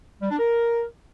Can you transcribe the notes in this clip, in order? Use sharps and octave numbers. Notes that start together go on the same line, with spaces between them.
G3
D4
A#4